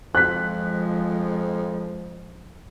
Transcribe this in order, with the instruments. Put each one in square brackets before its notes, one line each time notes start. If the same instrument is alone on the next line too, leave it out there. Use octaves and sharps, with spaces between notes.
[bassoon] F2 [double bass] F3 G#3 [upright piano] F#6 B6